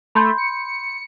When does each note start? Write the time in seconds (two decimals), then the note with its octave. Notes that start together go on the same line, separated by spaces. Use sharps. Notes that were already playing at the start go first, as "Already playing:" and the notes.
0.15 A3 B5 C6 G6
0.38 C#7